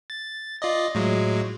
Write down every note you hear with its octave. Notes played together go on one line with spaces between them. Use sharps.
A6
F4 D5 D#5
A2 F#3 G#3